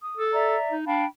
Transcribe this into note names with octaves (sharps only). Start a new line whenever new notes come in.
D#6
A4
D5 E5 A#5
D#4
D4 F5 G5 B5